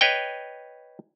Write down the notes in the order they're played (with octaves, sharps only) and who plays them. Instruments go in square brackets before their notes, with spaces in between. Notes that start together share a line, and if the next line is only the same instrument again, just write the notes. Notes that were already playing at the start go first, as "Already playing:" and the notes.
[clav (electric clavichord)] B4 C#5 D#5 G5